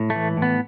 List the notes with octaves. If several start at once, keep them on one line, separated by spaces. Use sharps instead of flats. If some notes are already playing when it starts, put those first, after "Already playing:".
Already playing: A2
A3
E3
A2 B3